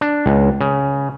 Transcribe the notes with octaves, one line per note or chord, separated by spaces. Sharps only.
D4
C#2
C#3